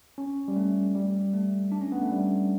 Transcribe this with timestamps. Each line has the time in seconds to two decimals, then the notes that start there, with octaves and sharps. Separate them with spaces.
0.18 C#4
0.48 G3
0.56 A3
0.95 G3
1.34 A3
1.72 D4
1.81 C#4
1.92 B3
2.02 A3
2.12 G3